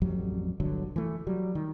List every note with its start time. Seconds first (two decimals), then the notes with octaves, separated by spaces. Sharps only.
0.02 A1 F2 F#3 G3
0.60 G1 C2 D3 F#3
0.96 E3 A3
1.27 F#3 G3
1.55 D#3